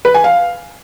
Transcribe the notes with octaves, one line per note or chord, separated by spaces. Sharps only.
B4
G#5
F5